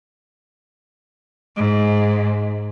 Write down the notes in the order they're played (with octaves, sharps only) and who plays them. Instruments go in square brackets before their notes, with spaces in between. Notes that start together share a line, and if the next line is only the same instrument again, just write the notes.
[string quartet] G#2